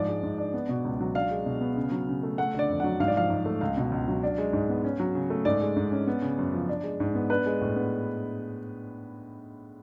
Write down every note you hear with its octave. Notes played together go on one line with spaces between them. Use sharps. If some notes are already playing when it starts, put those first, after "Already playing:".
Already playing: G#2 F3 D5
G#3
G#2
D4
B3
B2
C#2
F#3
D4 F5
G#3
B2
B3
C#3
F#3
C#3
A3
A3 F#5
D3 D5
F2
F#3 F#5
G#2 F5
D5
F3 F5
G#2
A3
C#2 F5
B2
C#2
F#3
D4
G#3
G#2
B3
C#4
F#3
C#3
A3
G#2 D5
G#3
G#2
C#4
B3
C#3
F#2
F3
D4
G#3
G#2
B3
D4 B4
G#3
A2
B3